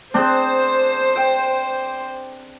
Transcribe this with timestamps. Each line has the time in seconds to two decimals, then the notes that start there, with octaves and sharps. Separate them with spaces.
0.14 C4 D4 G#4 C5 G6
1.16 G5